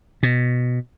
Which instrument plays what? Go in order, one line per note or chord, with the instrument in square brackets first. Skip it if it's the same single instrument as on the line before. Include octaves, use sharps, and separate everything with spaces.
[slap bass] B2